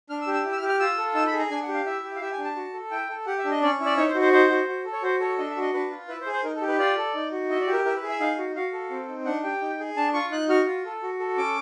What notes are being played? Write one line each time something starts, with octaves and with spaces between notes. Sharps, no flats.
D4 F6
E6
G4
E6
E4
E6
F6
G4
F6
F4 E6
A4
D#4 E6
B5
G#4
A#5
D4 G#5
F#5
G4
F5
E4 E5
G4
F5
G4 E5
G#5
D4
A5
F#4
A4
E4 G5
A4
G4 F#5
E5
D4
D#5
C#4 D5
E4
D5
D#4 C#5
C5
F#4
C5
D#4 C5
F#4
F#4
A4
C#5
F#4 C5
A4 C#5
D4 D#5
E5
F#4
D#5
D4 B4
F4
E4 B4
C5
G#4
C5
D#4 A#4
A4
G4
B4
F4 D5
A4
D#4
F#4
E4 D#5
D5
G4
A#4
E4 A#4
B4
G#4
E5
D#4 F5
F#4
F#4 F5
A4
C4
D#4
D4 F#5
G4 G5
D#4
G#4
D4 A5
F4 C#6
D#4 F#6
F#4 F6
F4
A4
F#4
A4
C#4 D6